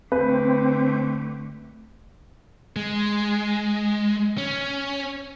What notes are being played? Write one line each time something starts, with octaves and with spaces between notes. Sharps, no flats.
D3 A3 C4 B4
G#3
C#4